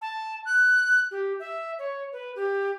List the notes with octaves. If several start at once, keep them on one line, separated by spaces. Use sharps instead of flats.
A5
F#6
G4
E5
C#5
B4
G4